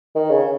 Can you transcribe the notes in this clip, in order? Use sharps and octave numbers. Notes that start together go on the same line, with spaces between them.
D#3
C#3